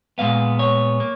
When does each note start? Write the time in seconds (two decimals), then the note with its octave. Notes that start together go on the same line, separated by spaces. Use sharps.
0.18 A#2 G#3 B3 F5
0.59 C#5
1.00 A#3